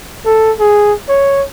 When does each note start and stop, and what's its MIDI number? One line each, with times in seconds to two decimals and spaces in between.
0.25 0.52 69
0.59 0.94 68
1.09 1.44 73